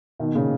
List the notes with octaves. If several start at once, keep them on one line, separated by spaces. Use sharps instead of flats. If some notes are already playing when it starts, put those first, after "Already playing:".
B2 D#3
A#2 C#3